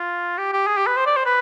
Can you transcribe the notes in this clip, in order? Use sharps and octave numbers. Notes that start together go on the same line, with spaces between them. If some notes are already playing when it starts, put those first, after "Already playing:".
Already playing: F4
G4
G4
G#4
G4
B4
C5
D5
C5
B4